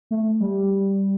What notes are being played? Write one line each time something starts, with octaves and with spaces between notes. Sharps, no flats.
A3
G3